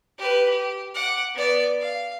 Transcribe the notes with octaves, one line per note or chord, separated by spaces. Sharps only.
G4 B4
G4
F#5 D6
B3 D5
F5